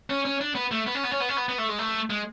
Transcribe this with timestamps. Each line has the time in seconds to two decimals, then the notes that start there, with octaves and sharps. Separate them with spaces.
0.10 C#4
0.25 C#4
0.41 D4
0.55 B3
0.71 A3
0.87 B3
0.95 C#4
1.04 B3
1.11 C#4
1.20 B3
1.29 C#4
1.37 B3
1.49 B3
1.58 A3
1.69 G#3
1.79 A3
2.10 G#3